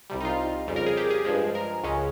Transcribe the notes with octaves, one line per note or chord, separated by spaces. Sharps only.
C2 C3 G3
D#4
F4
F2 C#3 G3
A#4
G#4
G4
G#4
G2 F3 G#3
A#4
C#2 C#3 G#3 C#4